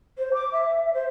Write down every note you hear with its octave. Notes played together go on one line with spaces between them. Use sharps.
C5
D6
E5
C5